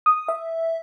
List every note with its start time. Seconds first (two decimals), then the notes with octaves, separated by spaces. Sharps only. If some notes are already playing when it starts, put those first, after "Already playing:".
0.06 D#6
0.28 E5